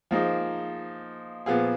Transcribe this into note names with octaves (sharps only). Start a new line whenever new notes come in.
F3 A#3 D#4 G#4
A#2 F3 B3 F4 G#4